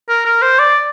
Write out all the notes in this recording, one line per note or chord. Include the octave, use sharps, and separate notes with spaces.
A#4
A#4
C5
D5